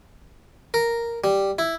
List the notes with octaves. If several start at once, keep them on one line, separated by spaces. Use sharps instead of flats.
A#4
G3
E4